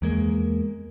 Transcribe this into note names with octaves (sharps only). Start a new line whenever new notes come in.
E2 G#3 A#3